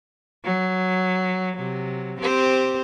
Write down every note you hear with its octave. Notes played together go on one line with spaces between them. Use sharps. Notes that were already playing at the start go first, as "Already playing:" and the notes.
F#3
C3 F#3
C4 G4 C5